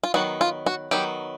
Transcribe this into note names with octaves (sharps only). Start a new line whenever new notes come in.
F4
D#3 F#3 B3 F#4
F4
F#4
D#3 F#3 B3 G4